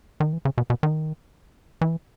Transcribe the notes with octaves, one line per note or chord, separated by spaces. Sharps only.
D#3
E3
C#3
B2
B2
D#3
E3